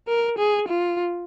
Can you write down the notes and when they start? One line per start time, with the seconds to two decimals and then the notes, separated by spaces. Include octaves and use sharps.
0.08 A#4
0.38 G#4
0.68 F4